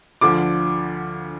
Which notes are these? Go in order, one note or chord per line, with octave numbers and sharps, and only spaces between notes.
D2 D3 F3 D6